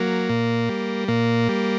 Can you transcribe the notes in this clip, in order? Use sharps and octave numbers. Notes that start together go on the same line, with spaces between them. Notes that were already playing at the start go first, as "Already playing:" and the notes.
Already playing: F#3 A#3
A#2
G3
A#2 A#3
G3